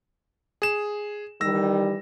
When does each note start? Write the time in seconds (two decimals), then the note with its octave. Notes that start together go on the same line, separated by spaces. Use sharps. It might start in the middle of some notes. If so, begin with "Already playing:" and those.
0.62 G#4 E7
1.41 D#3 E3 G3 E6 A#6